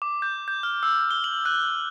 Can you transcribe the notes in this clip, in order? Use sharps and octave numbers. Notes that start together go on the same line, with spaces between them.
D6
G6
G6
F6
E6
G7
F#7
F#6